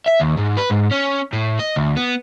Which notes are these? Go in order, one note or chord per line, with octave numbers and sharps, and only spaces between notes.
E5
D#2
G#2
B4
G#2
C#4
A2
D#5
D2
B3